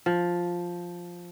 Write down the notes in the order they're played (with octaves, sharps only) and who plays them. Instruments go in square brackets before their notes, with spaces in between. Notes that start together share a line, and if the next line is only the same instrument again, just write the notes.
[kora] F3